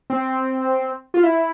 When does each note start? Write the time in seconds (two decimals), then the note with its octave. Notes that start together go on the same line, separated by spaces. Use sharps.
0.10 C4
1.14 F4
1.23 E4